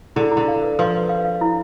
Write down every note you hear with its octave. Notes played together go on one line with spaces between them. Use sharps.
D3 E4
E4
D3
F5
B4
F3 B4
B4
F5
F5
E4